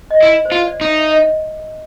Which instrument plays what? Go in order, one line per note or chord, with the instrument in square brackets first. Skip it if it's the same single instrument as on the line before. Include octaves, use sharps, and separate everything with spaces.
[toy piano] D#5
[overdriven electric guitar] E4 [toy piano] D5
[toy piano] C5
[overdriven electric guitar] F4
[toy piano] D5
[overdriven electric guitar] D#4
[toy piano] E5
E5
D#5